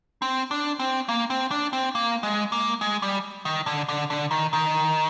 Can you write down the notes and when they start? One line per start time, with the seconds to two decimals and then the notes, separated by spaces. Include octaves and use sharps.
0.22 C4
0.51 D4
0.80 C4
1.09 A#3
1.30 C4
1.51 D4
1.73 C4
1.95 A#3
2.23 G#3
2.52 A#3
2.81 G#3
3.02 G3
3.45 D#3
3.66 D3
3.89 D3
4.10 D3
4.31 D#3
4.53 D#3